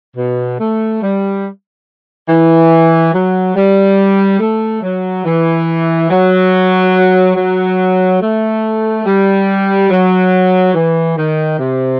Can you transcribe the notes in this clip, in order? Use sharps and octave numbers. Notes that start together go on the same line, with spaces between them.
B2
A3
G3
E3
F#3
G3
A3
F#3
E3
F#3
F#3
A3
G3
F#3
E3
D#3
C3